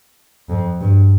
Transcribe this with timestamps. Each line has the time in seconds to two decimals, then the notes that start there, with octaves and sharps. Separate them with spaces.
0.49 F2
0.80 G2